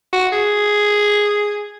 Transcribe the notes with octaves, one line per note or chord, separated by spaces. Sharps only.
F#4
G#4